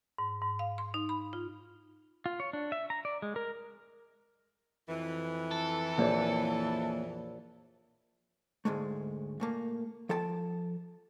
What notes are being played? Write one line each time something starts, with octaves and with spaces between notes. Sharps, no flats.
G#2
G#2
F5
C6
D#4
B5
F4
F4
C#5
D4
E5
A#5
D5
G#3
A#4
F2 E3
A4
A#1 A#3 C#5 D5
D2 G#2 G#3 A3
A#2 A3 A#3
F3 A4 G5 A5